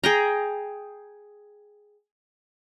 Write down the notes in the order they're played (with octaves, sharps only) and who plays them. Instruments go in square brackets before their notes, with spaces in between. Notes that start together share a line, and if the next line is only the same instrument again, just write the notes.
[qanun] G#4 G5 A#5